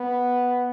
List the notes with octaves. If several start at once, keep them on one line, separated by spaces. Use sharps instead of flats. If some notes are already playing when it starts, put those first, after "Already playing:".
Already playing: B3